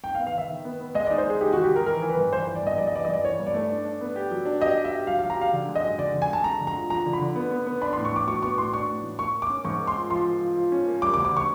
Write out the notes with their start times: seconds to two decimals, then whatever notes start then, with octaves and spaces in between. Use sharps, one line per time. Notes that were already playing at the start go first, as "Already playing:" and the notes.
0.04 D#4 G5
0.15 F5
0.19 B3
0.27 F5
0.34 D#3 E5
0.49 D#3
0.65 B3
0.81 B3
0.95 G#3 D#5
1.06 D#4 D5
1.18 C5
1.26 G#3 G#4
1.41 D#4 G4
1.53 D#3 F#4
1.64 G4
1.71 D#3 A#4
1.86 E3 A#4
2.02 E3
2.09 B4
2.17 G2
2.32 E3 C5
2.47 E3
2.55 D5
2.63 G2 D#5
2.78 G2 D5
2.87 D#5
2.94 E3 D5
3.05 D#5
3.09 G2 D5
3.24 E3 C#5
3.40 G2
3.47 D5
3.54 A3
3.70 D4
3.85 D4
4.01 B3
4.16 G4
4.31 F#3
4.45 D4
4.61 G4 D#5
4.77 G4
4.84 E5
4.92 G4
5.07 F#3 F5
5.19 F#3 F5
5.30 A#5
5.37 G4 F5
5.53 D3
5.68 G#3
5.76 D#5
5.83 F#2
5.98 D3 D5
6.14 D3
6.22 G#5
6.29 G#3 A5
6.44 G#3 A#5
6.60 D3
6.67 A#5
6.75 F3
6.90 F3 A#5
7.06 D3
7.13 B5
7.21 D3
7.36 B3
7.51 B3
7.67 B3
7.81 D4 B5
7.93 A2 C6
8.05 C#6
8.13 A2 D6
8.27 F#3 C#6
8.43 B3 C#6
8.57 A2 C6
8.73 D4 C#6
8.88 A2
9.03 A2
9.19 A#3 C#6
9.34 A#3
9.42 D6
9.50 C#4
9.65 G#2 C#6
9.80 A#3
9.87 C6
9.96 F3
10.10 F3 C6
10.26 F3
10.40 F3
10.56 F3
10.72 C#4
10.87 A#3
11.02 G3 D6
11.14 D6
11.17 D2
11.25 D6
11.32 D3 C#6